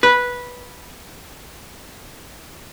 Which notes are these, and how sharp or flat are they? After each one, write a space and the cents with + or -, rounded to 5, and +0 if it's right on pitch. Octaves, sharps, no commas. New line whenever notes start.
B4 -10